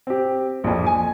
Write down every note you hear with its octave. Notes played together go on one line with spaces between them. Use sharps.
C4 G4
A#1 F2
G#5